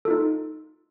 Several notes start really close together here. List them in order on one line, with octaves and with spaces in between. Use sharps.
A4 F4 D#4